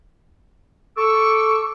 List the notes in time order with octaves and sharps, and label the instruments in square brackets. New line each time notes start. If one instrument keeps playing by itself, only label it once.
[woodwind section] A4 D6 E6 [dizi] C#6